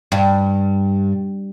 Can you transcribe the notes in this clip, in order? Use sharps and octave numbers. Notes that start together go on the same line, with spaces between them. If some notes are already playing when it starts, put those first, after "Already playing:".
G2